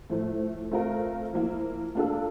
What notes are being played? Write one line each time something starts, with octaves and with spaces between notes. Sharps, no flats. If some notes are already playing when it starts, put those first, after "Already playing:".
A2 F3 A3
A3 C4 F4 A#4
F3 A#3 E4
A#3 D4 F4 A4